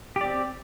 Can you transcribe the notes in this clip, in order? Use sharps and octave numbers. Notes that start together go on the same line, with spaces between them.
C4 G4 D5